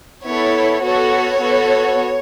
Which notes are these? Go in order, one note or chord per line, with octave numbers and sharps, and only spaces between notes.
B3 E4 A4 C#5
B3 F#4 A4 C#5
B3 F#4 A4